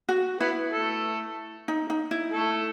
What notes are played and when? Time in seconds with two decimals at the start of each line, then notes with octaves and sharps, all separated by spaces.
0.09 F#4
0.40 B3 E4 B4
0.72 A3 A4
1.68 D#4
1.90 D#4
2.11 E4
2.32 A3 A4